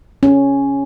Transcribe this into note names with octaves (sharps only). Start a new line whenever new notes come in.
C#4